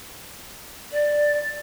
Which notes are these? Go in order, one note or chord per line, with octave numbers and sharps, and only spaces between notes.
D5